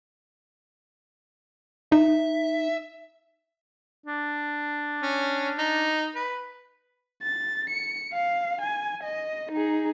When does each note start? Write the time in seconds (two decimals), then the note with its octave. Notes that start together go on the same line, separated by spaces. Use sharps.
1.92 D#4 E5
4.06 D4
5.02 C#4
5.58 D#4
6.15 B4
7.23 A6
7.70 C#7
8.13 F5
8.61 G#5
9.03 D#5
9.52 D#4 G#4